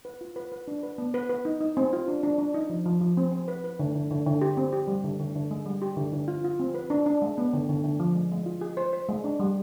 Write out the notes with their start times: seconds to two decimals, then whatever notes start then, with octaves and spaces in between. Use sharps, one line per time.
0.05 B4
0.21 F4
0.36 B4
0.52 B4
0.68 D4
0.83 B4
0.98 B3
1.14 B4
1.29 B4
1.45 D#4
1.61 D#4
1.77 C4
1.93 F4
2.08 D4
2.23 D4
2.38 D4
2.54 D#4
2.70 F3
2.85 F3
3.01 F3
3.17 C4
3.32 C4
3.48 B4
3.64 B4
3.79 D3
3.95 D3
4.11 D3
4.26 D3
4.41 G4
4.57 C4
4.73 G4
4.88 G3
5.04 D3
5.20 D3
5.35 D3
5.51 G#3
5.66 G3
5.82 G4
5.97 D3
6.12 D3
6.28 F4
6.44 F4
6.60 C4
6.75 B4
6.90 D4
7.06 D4
7.22 G#3
7.38 B3
7.53 D3
7.69 D3
7.84 D3
8.00 F3
8.15 G#3
8.31 G#3
8.46 F4
8.61 G#4
8.77 C5
8.93 C5
9.09 G#3
9.24 D4
9.40 G3